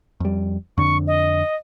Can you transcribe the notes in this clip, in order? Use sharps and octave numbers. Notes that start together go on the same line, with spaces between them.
F2 G3
F2 D3 C#6
D#5